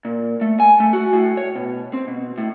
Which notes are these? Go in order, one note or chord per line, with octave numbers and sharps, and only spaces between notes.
A#2
A3
G#5
A3
F#4
A2
C#5
B2
C4
B2
A2